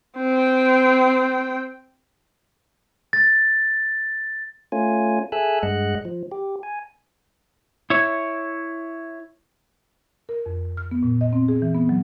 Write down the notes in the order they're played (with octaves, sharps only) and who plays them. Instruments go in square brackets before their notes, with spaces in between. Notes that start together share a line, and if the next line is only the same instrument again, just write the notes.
[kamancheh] C4 G5
[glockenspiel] A6
[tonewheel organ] A3 C#4 F4 G#5
G#4 A4 E5 G#5 E6 F#6
G2 G#3 D#5 F#5 F#6
F3
G4
G#5
[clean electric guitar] E4 C#5
[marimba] A#4
F2
F6
B3
A#2
D#5
C4
G#4
E3
B3
F#3